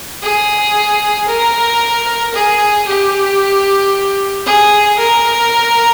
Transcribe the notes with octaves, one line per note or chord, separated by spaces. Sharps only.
G#4
A#4
G#4
G4
G#4
A#4